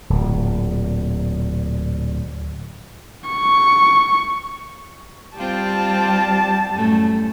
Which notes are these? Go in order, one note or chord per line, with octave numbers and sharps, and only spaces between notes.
D1 A#2
C#6
G3 C4 F4 G4 A5
F#2 A2 A3